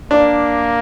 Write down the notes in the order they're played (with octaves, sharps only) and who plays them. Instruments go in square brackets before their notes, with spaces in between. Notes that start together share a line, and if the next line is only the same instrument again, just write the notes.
[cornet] A#3 [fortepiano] D4